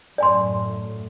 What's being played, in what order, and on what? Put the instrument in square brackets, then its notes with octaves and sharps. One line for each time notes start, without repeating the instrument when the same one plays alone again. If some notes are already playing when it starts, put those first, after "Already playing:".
[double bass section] F#2 A2 [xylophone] D5 G#5 C6